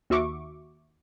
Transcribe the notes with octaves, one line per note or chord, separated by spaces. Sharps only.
D#2 F#4 E5 C#6 D6